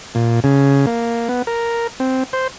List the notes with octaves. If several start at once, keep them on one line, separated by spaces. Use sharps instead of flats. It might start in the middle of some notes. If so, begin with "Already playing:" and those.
A#2
C#3
A#3
B3
A#4
C4
C5